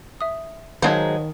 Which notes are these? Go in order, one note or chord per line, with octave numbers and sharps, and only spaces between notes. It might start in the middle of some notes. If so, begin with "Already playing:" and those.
E5 D#6
D#3 F#3 G#3 C4 C5 F5 A5 G#6